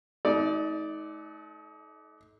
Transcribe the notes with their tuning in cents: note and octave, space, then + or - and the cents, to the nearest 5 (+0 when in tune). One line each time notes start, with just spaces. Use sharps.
A3 -40 D#4 +30 D5 +0